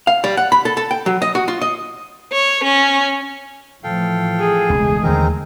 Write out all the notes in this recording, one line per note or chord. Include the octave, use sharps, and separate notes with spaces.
F5
G3
F#5
B5
A4
A4
G5
F#3
D#5
F#4
F4
D#5
C#5
C#4
A2 E3 F3 A4 F5 G5
G#4
E1 C#2 G#3 A3 C#4
D#2 D3 E3 C4 D#4 A#4